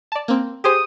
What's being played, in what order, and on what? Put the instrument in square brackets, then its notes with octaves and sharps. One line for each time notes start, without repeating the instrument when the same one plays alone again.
[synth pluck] D5 A5
A#3 C4
[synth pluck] G4 G#4 C5 [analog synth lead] D#6